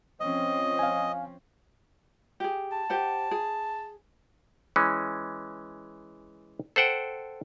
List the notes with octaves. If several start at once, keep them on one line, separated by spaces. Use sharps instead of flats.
F3 C4 C#4 D#5
F5 G#5
G4 G#4
A5
G4 C5 F#5
G#4
E3 G#3 C#4
A4 C5 F#5 G5